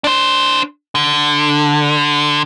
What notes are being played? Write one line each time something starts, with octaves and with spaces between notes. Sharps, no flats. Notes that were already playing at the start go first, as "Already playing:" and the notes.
D4 C5
D3